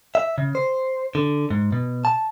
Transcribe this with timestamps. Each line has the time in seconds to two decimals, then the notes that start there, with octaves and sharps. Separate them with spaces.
0.15 E5
0.38 C#3
0.55 C5
1.15 D3
1.50 G#2
1.72 B2
2.05 A5